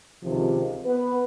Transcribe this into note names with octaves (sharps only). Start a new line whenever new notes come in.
C#2 C3 D#3 F3
B3 B4